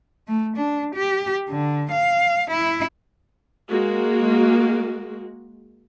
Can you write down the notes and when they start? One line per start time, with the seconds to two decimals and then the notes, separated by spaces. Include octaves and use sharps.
0.28 A3
0.57 D4
0.95 G4
1.49 D3
1.91 F5
2.51 E4
3.68 G#3 A#3 F#4